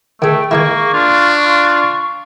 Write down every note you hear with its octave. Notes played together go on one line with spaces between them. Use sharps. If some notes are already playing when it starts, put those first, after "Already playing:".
D#3 A3 G#4 G5
D#3 G#3 A#3 E4 C#6
D4 F4
F4